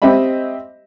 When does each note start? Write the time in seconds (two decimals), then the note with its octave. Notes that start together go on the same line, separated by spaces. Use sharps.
0.02 C4 G4 D#5 E5 B5